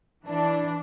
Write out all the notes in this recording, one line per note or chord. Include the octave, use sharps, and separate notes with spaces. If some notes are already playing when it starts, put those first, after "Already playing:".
E3 D4